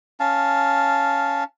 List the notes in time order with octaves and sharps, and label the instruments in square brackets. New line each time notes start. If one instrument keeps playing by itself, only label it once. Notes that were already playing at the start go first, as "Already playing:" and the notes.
[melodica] C#4 F5 A5